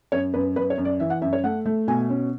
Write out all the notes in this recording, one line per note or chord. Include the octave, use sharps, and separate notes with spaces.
F#2 C#5
F#2 B4
F#2 B4
C#5
F#2
D5
E3 E5
F#5
F#2 E5
C#5
A3 F#5
A3
B2 G#5
C#4